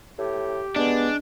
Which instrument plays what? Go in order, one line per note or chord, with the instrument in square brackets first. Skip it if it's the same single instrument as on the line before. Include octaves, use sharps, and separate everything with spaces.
[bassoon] A2 [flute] G4
[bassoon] G#3 [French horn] B3 [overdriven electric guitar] D4